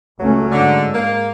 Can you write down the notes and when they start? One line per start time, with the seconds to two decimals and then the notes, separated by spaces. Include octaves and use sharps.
0.19 C#2 F#3 A3 C#4
0.52 G#2 D3
0.94 A#3